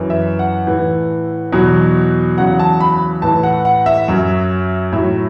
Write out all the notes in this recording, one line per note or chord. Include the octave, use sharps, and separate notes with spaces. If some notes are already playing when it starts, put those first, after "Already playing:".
Already playing: F#2 E3
E5
F#5
A2 E3
E2 B2 F#3
E2 C#3 F#3 F#5
A5
B5
A2 E3 A5
F#5
F#5
E5
F#2 F#3
A2 F#3 E5